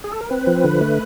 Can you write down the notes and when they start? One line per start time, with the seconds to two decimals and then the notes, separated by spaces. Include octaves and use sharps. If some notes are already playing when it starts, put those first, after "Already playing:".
0.04 G#4
0.12 A4
0.21 A#4
0.30 C4 B4
0.47 F3
0.64 D3
0.81 A3